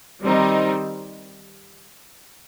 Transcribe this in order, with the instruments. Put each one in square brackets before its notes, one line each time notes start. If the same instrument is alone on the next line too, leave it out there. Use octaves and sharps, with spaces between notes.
[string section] D#3 G3 C4 D#4